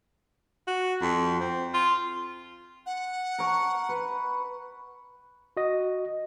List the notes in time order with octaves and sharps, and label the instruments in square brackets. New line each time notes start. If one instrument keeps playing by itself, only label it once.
[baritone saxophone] F#4
F2
C4
F4
[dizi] F#5
[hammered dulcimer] A#4 C#6
B4
[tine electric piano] F#4 D#5